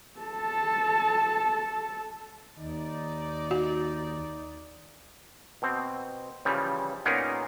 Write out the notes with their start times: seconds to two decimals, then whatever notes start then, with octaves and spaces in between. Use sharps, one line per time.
0.20 A4 A5
2.58 D#2 D#4 D5
3.51 F#4
5.62 B2 C4
6.45 C#3 E3 F3 G3
7.05 A#2 B3 C#4 D#4 G#4 A#4